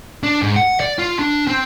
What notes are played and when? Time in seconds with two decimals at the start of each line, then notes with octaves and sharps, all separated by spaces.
0.23 D4
0.42 G#2
0.56 F#5
0.80 D5
0.99 F4
1.19 D4
1.48 C4